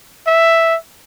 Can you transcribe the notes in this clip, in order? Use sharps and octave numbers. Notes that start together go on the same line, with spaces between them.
E5